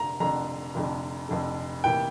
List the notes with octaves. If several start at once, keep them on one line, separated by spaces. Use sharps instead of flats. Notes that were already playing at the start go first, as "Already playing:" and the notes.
Already playing: F1 D3 A#5
F1 F2 D3 A#5
F1 F2 D3
F1 F2 D3
F1 E3 A#3 G5